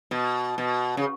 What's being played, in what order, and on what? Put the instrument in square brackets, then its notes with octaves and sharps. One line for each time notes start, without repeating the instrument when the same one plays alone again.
[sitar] B2
B2
C#3